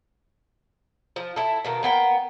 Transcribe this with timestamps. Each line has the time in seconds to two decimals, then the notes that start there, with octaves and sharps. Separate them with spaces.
1.16 F3
1.36 E4 A4
1.65 B2 D#3 A#3
1.83 A#3 B3 G5